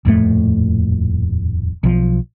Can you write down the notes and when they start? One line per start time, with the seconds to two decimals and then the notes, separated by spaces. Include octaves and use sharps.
0.05 D#1 F2 A2 A3
1.83 B1 F3